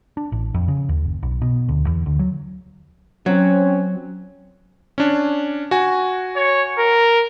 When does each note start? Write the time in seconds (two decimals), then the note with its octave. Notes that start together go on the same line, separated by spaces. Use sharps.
0.17 D4
0.32 A1
0.54 F2
0.68 C#3
0.89 D#2
1.05 F#1
1.23 B1
1.42 B2
1.69 D2
1.87 E2
2.06 D2
2.19 F#3
3.26 F#3 C4 C#4
4.98 C#4 D4
5.71 F#4 G#5
6.36 C#5
6.78 A#4